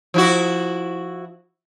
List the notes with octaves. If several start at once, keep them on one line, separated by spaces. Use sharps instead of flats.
F3 E4 F#4